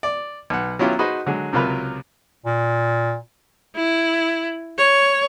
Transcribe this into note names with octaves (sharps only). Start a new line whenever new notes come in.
D5
B1 F#5
F#3 B3 C#4 E4 F4 G4
D#4 F#4 G#4 B4 C5 D#5
D3 F#3 G#3
C#2 C3 F#3 F4 A#4 B4
A#2
E4
C#5